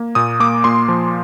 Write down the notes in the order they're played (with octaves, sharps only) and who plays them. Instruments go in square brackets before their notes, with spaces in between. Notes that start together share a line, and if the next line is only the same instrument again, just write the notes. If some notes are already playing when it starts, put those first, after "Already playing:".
Already playing: [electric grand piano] A#3
A#2 D#6
A#3 D6
A#2 C6
F3